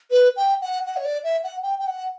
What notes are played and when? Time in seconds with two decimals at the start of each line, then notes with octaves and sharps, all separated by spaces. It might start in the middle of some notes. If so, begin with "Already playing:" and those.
0.11 B4
0.37 G5
0.61 F#5
0.86 F#5
0.97 C#5
1.05 D5
1.24 E5
1.44 F#5
1.63 G5
1.79 G5
1.87 F#5